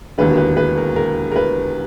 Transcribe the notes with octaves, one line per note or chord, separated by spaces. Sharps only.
E1 D#2 D3 B4
A#4
B4
B4
A#4
A#4
A#4
B4